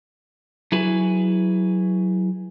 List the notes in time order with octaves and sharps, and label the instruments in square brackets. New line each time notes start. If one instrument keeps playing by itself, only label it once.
[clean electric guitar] F#3 E4 G#4 B4